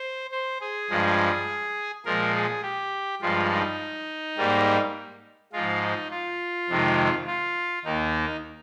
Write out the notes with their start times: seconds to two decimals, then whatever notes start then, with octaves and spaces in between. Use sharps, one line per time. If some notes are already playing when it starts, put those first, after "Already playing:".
Already playing: C5
0.32 C5
0.61 G#4
0.90 G2 F3 G#3
2.06 A#2 F3 G#3 A#4
2.35 G#4
2.63 G4
3.22 G2 F3 G#3 F4
3.50 D#4
4.37 G#2 G3 A#3
5.53 G#2 F3 G#3 F4
5.82 D#4
6.11 F4
6.69 F2 C3 D#3 G#3
7.27 F4
7.84 D#2 D#3 A#3 D#4